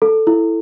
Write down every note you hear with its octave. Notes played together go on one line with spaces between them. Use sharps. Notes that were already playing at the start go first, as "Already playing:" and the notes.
A4
E4